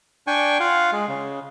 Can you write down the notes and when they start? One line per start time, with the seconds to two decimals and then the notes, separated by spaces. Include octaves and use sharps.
0.27 D4 G5 G#5 C#6
0.60 F4 F5 F#5
0.92 G#3
1.08 C#3